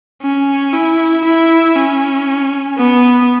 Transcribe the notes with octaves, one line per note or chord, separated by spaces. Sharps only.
C#4
E4
E4
C#4
B3